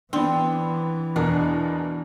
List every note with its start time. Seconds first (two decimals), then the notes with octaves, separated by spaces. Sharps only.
0.13 E3 B3 C4 D4
1.16 E2 B2 D4 A#4